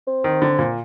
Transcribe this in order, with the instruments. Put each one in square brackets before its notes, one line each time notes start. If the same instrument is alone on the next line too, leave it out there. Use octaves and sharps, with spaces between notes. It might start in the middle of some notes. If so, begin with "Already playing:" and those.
[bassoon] C4
[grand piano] D#3
D3
A#2